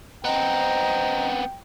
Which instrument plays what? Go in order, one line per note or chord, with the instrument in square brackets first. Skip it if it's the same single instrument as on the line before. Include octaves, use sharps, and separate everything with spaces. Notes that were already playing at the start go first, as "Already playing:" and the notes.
[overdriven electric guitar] B3 C4 [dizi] D#5 [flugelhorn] G5 [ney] A#5